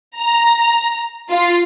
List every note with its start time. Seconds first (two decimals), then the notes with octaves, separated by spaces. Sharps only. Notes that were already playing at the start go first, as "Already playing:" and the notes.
0.17 A#5
1.30 F4